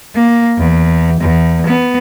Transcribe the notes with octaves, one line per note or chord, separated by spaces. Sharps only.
A#3
E2
E2
B3